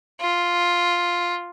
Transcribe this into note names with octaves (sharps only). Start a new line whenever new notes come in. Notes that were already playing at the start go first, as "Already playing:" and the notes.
F4